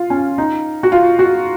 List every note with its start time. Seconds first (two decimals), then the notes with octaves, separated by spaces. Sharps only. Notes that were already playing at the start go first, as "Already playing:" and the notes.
Already playing: F4
0.10 C#4
0.38 D#4
0.83 F#4
0.92 F4
1.19 F#4